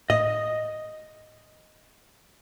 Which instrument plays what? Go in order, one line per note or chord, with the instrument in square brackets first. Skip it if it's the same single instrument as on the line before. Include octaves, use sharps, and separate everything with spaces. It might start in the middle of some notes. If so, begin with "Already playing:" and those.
[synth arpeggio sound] A2 [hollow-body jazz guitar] D#5